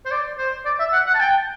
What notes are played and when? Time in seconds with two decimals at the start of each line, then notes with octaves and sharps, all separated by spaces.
0.06 C5
0.11 D5
0.38 C5
0.65 D5
0.79 E5
0.93 F#5
1.06 F#5
1.14 A5
1.20 G5